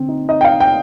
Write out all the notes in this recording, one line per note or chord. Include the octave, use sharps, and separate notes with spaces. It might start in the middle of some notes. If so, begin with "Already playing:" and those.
Already playing: D3 C4
D#4
D#4 D#5
G5
D#4 F5
G5